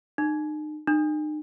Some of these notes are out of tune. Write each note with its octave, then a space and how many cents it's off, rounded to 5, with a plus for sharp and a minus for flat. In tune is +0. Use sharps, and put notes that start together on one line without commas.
D#4 -35
D#4 -40